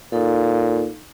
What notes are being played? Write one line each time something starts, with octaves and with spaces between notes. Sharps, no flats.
A#2 D#4 A4 F5